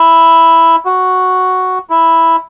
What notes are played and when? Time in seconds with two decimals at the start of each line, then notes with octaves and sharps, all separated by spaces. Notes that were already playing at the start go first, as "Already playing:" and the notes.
Already playing: E4
0.85 F#4
1.90 E4